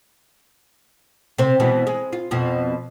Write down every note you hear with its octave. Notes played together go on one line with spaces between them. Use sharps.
C3 C4
B2 E3 G#3
G#3
F4
F2 B2 F3